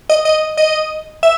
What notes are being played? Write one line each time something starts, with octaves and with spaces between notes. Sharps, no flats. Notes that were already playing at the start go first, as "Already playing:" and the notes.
D#5
D#5
D#5
E5